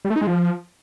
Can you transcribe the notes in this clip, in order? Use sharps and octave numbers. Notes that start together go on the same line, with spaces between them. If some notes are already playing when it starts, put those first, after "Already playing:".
G3
A3
D#4
G#3
F3